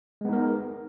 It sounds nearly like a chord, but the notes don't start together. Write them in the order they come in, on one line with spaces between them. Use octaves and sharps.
G#3 B3 D#4 A#4